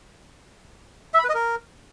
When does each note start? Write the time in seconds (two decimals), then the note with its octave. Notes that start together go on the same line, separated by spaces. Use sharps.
1.14 E5
1.19 B5
1.24 B4
1.29 D#5
1.34 A#4